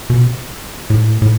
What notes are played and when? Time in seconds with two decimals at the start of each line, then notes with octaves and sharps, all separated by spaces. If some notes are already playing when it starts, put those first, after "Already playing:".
0.10 B2
0.90 A2
1.22 A2